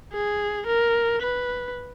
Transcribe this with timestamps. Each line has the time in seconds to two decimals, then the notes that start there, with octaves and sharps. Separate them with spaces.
0.13 G#4
0.67 A#4
1.22 B4